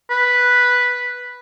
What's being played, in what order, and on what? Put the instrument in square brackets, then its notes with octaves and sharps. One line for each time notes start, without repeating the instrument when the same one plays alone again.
[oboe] B4